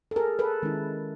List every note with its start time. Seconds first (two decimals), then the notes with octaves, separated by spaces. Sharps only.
0.11 A4
0.16 G#4 A#4
0.39 A4 B4
0.63 D#3 G#3 C#4 E4